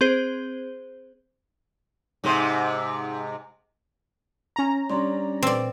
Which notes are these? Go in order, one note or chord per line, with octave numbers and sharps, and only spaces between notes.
C4 G#4 C5
G#2 C3 C5
C#4 A#5
G3 D4 C#5 C6
A#2 C4 B4 D5 E6